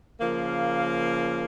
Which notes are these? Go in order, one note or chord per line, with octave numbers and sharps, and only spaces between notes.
C#3 F3 A#3